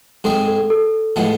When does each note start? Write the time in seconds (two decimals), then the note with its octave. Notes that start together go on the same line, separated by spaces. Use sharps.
0.24 G#2 G#3 C4 G#4 A4
0.47 A4
0.58 A4
0.70 A4
1.16 A2 F3 G#3 B3